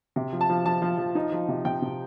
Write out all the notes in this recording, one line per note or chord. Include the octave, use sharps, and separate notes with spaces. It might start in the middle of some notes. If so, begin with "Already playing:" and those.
C3
F3
A5
F3
F3 A5
F3
F3
D#4
F3
C3
C3 G5
C3